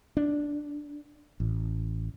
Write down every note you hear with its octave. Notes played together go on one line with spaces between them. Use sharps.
D4
A1